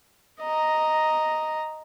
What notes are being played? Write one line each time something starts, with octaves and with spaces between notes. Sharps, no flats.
D#5 A#5